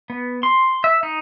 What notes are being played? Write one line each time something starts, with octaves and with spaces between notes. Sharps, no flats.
B3
C6
E5
D#4